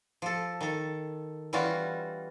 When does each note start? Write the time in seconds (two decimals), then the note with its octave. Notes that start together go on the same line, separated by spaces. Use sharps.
0.22 F3 A4
0.61 D#3 A4
1.53 E3 G3 C#4 F4 F#4